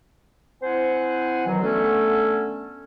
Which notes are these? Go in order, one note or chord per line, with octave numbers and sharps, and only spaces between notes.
C4 E4 C5 F#5 G#5
B2 D#3 E3 F#3
D3 A3 B3 C#4 A4